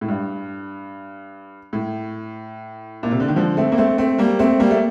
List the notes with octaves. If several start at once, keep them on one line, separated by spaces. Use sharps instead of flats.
A2
G2
A2
A#2
C3
D3
D#3
D3 F3
A3 C4
A#3
A3 C4
A3 C4
G3 A#3
A3 C4
G3 A#3
A3